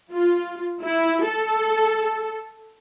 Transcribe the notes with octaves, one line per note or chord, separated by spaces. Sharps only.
F4
E4
A4